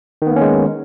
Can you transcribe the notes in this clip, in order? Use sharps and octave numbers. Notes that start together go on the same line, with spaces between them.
D#3 G#3 A#3 B3 C#4